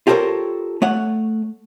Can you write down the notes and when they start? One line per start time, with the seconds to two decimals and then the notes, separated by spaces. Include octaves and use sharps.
0.07 F4 G4 A4 A#4 C5 C#5
0.82 A3 C#5 F#5